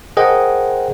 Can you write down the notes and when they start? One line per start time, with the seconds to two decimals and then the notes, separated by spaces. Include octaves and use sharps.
0.17 G#4 A#4 C5 D#5 F#5 G5